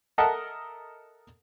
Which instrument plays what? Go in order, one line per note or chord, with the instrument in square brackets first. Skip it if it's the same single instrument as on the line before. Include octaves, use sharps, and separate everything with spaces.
[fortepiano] A4 A#4 D#5 E5 F#5 A5